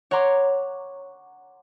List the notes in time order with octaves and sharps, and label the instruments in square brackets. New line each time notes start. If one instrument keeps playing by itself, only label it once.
[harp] C#5 F#5 A#5 C6 D6